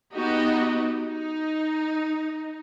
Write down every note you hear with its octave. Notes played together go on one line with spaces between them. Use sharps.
B3 D#4 F#4 G4 D#5
D#4